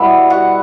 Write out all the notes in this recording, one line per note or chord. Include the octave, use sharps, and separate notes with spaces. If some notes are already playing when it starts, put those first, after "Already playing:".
Already playing: B2 G3 B3 E4 E5
F#4 F#5